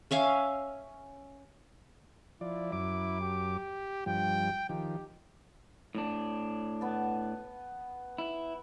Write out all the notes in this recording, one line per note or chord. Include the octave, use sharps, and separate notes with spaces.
C#4 E5 F5 G#5
F3 E4 D5
F#2 D6
G4
G2 F3 G5
D#3 F3 G4
A2 D4
B3 A5
E4